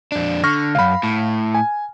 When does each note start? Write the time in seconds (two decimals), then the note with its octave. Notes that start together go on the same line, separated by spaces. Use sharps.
0.12 F2 D4
0.44 D3 C#6 F6 A#6
0.75 C#2 F#2 F5 B5
1.03 A2
1.55 G#5